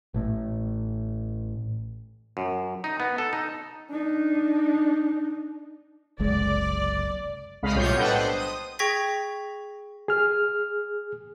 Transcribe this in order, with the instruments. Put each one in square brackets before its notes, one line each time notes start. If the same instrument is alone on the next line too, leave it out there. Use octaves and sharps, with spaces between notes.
[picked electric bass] A1 A2
[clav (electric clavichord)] F#2
D#4
B3
A4
D#4
[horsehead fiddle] D4 D#4
[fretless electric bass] F#1 C2 G#3 [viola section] D5
[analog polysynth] C2 C#3 G#3 D#5 F5 B5
B1 A2 G3 F4 C#5 G6
D4 A4 B4 D#5 F#5 G5
C5
D#6
[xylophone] G#4 G5 C#6 G#6 A#6 B6
[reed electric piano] G#4 F6